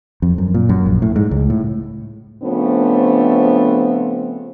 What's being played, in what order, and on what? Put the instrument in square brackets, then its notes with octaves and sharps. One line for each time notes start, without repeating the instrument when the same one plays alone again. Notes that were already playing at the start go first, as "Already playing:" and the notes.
[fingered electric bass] F2
F#2
A#2
F#2
A#1
A2
G#2
C#2
A2
[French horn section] C#3 F3 A3 B3 C4 D4